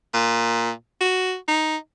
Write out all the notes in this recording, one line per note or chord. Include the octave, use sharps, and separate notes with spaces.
A#2
F#4
D#4